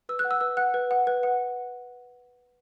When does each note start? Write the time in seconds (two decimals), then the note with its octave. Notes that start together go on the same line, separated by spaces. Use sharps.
0.09 B4 E6
0.19 F#6
0.25 F#5
0.31 E6
0.41 B4 E6
0.57 F#5 F#6
0.74 B4
0.91 F#5
1.07 B4
1.23 F#5